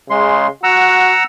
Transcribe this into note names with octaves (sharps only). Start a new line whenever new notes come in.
C#3 G#3 C6
F#4 F#5 A#5 E6